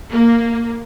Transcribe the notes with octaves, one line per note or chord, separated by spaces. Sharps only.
A#3